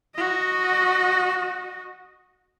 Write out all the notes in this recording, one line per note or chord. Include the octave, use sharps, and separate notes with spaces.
F#4 D#5